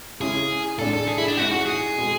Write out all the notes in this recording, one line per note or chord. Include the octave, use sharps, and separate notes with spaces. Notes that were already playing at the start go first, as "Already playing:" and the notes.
C#3 G#3 C#4 E4 G#4
A2 G#3 D4 A4
A4
G#4
E4
D4
G#2 G#3 C#4 E4 F#4
F#4
G#4
B2 G#3